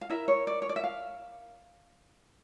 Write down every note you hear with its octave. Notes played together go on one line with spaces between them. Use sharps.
F5
E4 A#4 E5
C#5
D5
C#5
D5
E5
F5